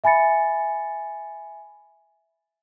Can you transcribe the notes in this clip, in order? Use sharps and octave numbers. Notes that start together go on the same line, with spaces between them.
E5 G#5 B5 A6 C#7